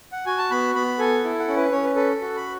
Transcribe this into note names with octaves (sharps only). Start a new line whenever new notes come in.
F#5
F#4 G#5
A5
B3 B5
B3 B5
A4 G#5
E4
F#5
C#4
B4
C#4 C#5
B4
A4 B4
F#4
B5